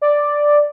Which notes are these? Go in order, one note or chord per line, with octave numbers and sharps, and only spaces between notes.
D5